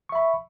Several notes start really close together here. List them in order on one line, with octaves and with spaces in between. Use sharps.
C#6 E5 B5